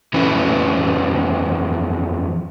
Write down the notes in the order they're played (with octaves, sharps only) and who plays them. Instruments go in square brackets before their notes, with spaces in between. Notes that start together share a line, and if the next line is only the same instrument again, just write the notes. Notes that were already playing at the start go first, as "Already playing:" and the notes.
[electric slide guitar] F2 E3 F#3 C#4 E4 B4